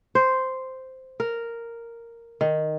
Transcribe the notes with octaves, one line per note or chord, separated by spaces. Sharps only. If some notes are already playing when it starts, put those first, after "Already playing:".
C5
A#4
D#3